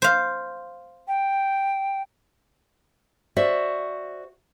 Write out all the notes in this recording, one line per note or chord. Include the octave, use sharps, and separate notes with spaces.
C5 F5
G5
F#4 C5 D5 E5